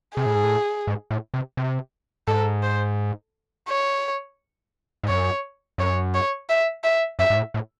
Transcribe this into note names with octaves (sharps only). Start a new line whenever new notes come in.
C3 G#4
A2
G#2
A2
G#2
A2
C3
C3
G#2 A4
C5
C#5
G#2
F#2 C#5
F#2 C#5
C#5
E5
E5
F#2 E5
G#2
A2
A2